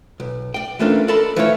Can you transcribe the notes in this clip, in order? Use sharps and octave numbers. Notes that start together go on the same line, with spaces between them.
B1
D5 G5
E3 A3 A#3 C#4 D4 F4
A4 A#4 D5 D#5 A5 B5
E3 F3 A3 E4 A4 C#5